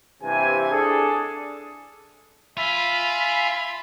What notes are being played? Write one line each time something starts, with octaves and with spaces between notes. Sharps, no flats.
G2 C3 E3 G#5
D4 G#4 A4
F4 E5 G#5 B5 E6